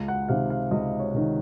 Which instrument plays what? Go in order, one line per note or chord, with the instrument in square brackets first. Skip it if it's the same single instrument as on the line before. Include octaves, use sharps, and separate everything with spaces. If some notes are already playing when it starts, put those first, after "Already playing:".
Already playing: [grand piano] C#2
F#5
C3 D#3 F5
F5
C#2 D#5
C#5
C3 D#3